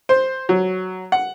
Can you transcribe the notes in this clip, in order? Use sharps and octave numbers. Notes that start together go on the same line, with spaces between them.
C5
F#3
F#5